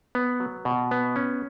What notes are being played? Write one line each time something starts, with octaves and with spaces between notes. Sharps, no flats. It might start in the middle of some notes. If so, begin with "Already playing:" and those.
B3
F#3
B2
B3
C#4